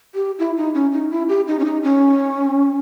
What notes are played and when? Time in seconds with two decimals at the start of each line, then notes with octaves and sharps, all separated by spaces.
0.15 G4
0.39 E4
0.57 D#4
0.74 C#4
0.92 D#4
1.11 E4
1.29 G4
1.47 D#4
1.59 C#4
1.65 D#4
1.83 C#4